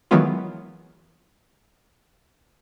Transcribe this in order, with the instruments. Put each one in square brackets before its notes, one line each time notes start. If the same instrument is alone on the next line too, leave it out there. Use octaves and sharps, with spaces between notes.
[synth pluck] D#3 E3 F#3 G#3 B3 F4